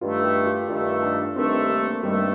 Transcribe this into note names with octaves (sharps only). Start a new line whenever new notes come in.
G2 D#3 A3 F4
G4
F4
G2 D#3 A3 F4
D4
G2 D#3 A3 C4
A#3
G2 D#3 G3 A3